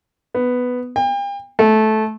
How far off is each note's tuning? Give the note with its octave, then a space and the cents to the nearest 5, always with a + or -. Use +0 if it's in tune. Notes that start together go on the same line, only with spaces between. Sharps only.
B3 +5
G5 +40
A3 -15